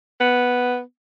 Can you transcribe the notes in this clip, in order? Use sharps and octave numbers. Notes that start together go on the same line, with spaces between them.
B3